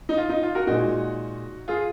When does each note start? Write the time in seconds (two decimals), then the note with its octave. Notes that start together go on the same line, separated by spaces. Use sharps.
0.09 D#4
0.17 F4
0.29 D#4
0.43 F4
0.55 F#4 A#4
0.67 A#2 G#3 D#4 F#4
1.68 F4 G#4